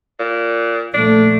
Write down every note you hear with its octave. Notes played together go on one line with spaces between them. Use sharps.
A#2
A#1 A3 D4